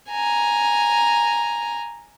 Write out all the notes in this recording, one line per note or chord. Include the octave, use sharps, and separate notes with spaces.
G#5 A#5